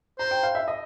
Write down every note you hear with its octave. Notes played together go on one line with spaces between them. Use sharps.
C5 A#5
G5
F5
E5
D#5